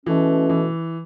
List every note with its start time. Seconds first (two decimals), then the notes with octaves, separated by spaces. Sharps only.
0.06 B2 E3 A3 C#4
0.49 E3